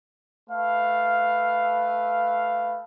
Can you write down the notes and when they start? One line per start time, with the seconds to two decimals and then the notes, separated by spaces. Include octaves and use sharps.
0.50 A3 B4 F5